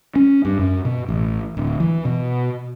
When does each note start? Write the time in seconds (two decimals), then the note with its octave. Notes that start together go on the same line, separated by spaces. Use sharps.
0.16 C#4
0.45 G2
0.59 F#2
0.85 B2
1.09 A1
1.57 D1
1.80 E3
2.05 B2